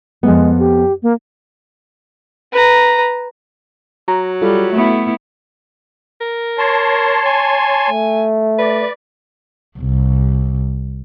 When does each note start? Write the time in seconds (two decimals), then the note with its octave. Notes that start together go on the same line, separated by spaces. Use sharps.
0.23 F2 G#3 B3
0.59 G4
1.02 A#3
2.52 B4 A#5
4.08 F#3 A#5
4.42 G3 F4 A4
4.73 A3 B3 E4
6.21 A#4
6.58 C#5 A5 C6
7.26 G#5
7.90 A3
8.59 B4 D5
9.78 C2